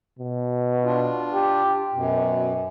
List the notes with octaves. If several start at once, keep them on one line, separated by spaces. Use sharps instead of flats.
B2
D4 F4
G4
F#2 B2